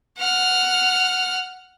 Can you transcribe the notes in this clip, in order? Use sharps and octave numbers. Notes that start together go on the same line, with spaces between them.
F#5 F6